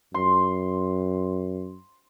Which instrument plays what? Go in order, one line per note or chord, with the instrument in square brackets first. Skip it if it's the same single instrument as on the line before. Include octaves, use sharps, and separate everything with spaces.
[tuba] F#2 [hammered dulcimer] C6